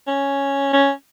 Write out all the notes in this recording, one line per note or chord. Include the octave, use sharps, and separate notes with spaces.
C#4
C#4